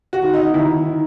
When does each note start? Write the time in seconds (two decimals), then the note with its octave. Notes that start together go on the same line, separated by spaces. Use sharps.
0.13 F#4
0.22 D#3
0.34 D#4
0.54 D#2 E4
0.85 D#3